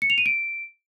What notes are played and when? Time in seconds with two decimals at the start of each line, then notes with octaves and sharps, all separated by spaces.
0.02 C#7
0.10 F7
0.18 D#7
0.26 D7